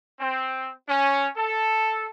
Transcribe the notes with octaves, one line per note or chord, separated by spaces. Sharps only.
C4
C#4
A4